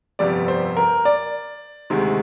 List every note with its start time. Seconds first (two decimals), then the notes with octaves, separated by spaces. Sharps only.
0.19 G1 F2 C3 G3 D5
0.48 C5
0.77 A#4
1.05 D5
1.90 D2 C3 D#3 G#3